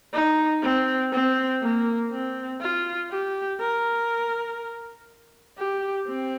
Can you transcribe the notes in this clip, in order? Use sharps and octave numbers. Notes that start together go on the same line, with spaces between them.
D#4
C4
C4
A#3
C4
F4
G4
A#4
G4
C4